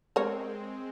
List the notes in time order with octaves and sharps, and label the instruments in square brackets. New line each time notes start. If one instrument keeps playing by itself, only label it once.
[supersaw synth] G#3 C4 [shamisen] A#4 C#5